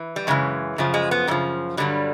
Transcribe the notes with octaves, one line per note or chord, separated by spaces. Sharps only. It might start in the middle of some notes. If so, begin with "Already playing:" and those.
Already playing: E3
G3
F#2 C#3 E3 G#3
F#2 C#3 F3
G#3
B3
F#2 C#3 F3 G3
G2 D3 F#3 G3